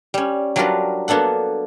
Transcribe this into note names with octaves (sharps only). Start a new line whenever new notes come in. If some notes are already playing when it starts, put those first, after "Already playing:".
G3 C#4
F#3 G3 D4 F4 A#4 B4
A#3 B3 D4 A4 F#5